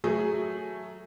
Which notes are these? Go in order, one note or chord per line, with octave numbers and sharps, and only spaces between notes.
F#3 A3 G#4